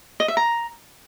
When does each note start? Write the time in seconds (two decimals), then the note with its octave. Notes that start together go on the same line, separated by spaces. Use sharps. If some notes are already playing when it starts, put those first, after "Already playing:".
0.20 D#5
0.28 E5
0.37 A#5